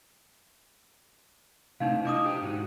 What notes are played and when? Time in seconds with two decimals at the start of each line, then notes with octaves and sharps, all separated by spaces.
1.80 C3 A3 C4 D4 D#4 F5
2.05 D4 E4 F4 D#5 D6 D#6
2.25 G4 C5 G5
2.42 G#2 D#4 F#4